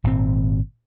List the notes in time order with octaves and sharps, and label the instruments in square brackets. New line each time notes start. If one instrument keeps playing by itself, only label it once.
[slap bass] G#1 G2 A#2 C4